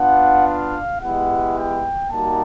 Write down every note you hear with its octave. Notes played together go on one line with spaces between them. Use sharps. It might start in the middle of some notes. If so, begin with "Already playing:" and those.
Already playing: B3 D4 F4 F#5
F5
G#3 B3 E4 G4 F#5
G5
G3 A#3 D#4 F#4 A5